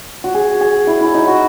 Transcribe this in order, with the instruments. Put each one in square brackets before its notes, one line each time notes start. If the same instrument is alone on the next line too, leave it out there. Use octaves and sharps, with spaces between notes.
[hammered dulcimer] F#4
G#4
G#4
E4
E4
D#4
F#4